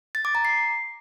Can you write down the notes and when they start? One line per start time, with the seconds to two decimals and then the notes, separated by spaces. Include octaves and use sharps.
0.15 A6
0.25 D6
0.35 A#5
0.45 C7